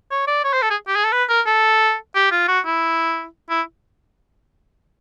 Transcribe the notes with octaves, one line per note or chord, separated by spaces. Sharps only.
C#5
D5
C#5
C5
A4
G#4
G4
G#4
A4
B4
A#4
A4
G4
F4
F#4
E4
E4